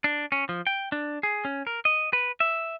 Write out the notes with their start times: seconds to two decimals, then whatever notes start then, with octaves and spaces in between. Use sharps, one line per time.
0.04 D4
0.32 C#4
0.49 F3
0.67 G5
0.92 D4
1.23 G#4
1.45 C#4
1.67 A#4
1.85 D#5
2.13 B4
2.40 E5